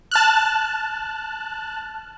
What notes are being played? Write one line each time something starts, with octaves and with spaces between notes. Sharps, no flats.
A5 F6 F#6